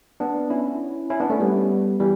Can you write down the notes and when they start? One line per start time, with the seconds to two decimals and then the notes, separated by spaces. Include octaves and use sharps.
0.20 B3 D4
0.50 C#4 E4
1.10 C#4 E4
1.20 B3 D4
1.30 A3 C#4
1.40 G3 B3
2.00 E3 G3